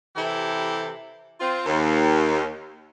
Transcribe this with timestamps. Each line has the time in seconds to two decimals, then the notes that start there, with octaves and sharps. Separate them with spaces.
0.16 C3 E3 E4 G4 A4
1.40 C4 F4
1.65 D#2